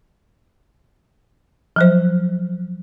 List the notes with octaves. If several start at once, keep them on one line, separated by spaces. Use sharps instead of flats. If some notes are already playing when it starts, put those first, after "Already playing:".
F3 F#3 C5